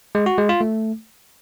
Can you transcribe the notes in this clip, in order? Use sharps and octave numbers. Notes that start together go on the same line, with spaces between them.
G#3
F#4
G#3
F4
A3